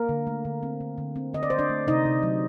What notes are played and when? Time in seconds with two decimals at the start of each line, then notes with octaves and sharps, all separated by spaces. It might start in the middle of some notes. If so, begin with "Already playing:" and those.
Already playing: A#3 A#4
0.09 D3
0.27 A3
0.45 D3
0.63 C4
0.81 D3
0.98 D3
1.16 C4
1.34 D3 D#5
1.43 D5
1.50 D3 C5
1.59 D4 D5
1.70 A3
1.87 C3 D#4 D#5
2.05 C3
2.23 F#3